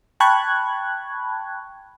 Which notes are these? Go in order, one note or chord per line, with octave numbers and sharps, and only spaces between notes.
G5 A5 B5 C#6 F#6 G#6